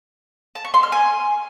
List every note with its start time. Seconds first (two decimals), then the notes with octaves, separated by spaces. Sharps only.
0.55 A5
0.65 C#6
0.74 C6
0.83 F6
0.92 G#5